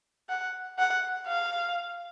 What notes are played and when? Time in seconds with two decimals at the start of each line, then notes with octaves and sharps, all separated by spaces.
0.29 F#5
0.79 F#5
1.27 F5